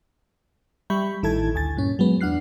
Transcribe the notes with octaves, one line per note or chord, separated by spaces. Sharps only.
G3 G4 E5 B5 C#6 G6
A1 D#3 E4 A4 A5 G#6
D2 G#5 A6
G2 A#2 C#4
F#3 G#3 B3
E2 D4 F#5 F6 F#6 C7